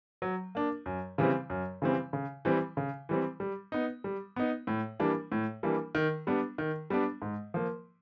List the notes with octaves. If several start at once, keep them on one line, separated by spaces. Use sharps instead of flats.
F#3
A#3 D4
F#2
C#3 E3 G3 C4
F#2
C#3 E3 G3 C4
C#3
E3 G3 C4
C#3
E3 G3 C4
G3
B3 D#4
G3
B3 D#4
A2
E3 G3 A#3 D4
A2
E3 G3 A#3 D4
D#3
G3 B3 D4
D#3
G3 B3 D4
G#2
F3 A#3